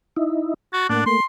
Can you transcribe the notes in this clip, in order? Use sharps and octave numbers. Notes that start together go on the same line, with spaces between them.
D#4 E4
F#4 A6
A2 A#3 D4 F#5
A3 A#3 C6